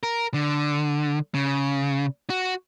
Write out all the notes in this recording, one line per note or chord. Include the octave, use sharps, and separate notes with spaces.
A#4
D3
C#3
F#4